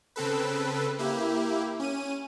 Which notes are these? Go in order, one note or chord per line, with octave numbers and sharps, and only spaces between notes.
C#3 C4 A4 B4
A#3 E4 G4
C#4 D#7